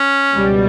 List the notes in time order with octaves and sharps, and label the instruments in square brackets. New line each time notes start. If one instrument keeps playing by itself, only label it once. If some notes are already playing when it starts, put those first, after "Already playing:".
Already playing: [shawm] C#4
[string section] C#2 B2 G3